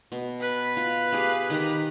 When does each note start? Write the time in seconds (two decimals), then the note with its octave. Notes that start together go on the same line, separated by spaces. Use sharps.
0.12 B2
0.41 B4
0.77 F4
1.12 G4 G#4 F5
1.50 D#3 G4 A#5